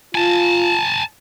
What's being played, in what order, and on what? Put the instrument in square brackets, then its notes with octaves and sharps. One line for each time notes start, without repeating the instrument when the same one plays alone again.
[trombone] F4 [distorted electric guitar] G#5 A5